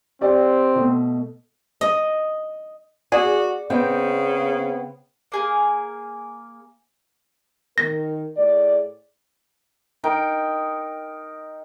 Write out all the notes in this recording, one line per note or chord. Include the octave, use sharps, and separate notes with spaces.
C4 G4 D5
B2 A3
D#5
F#4 G#4 D5
C#3 B3 C4 G5
A#3 G#4 A#4
D#3 A#4 A#6
A2 G#4 D5
D#4 A#4 G5